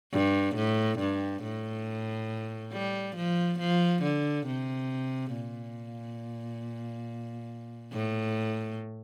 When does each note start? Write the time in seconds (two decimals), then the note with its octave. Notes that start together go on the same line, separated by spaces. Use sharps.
0.13 G2
0.56 A2
0.99 G2
1.43 A2
2.73 G3
3.16 F3
3.59 F3
4.03 D3
4.46 C3
5.33 A#2
7.93 A2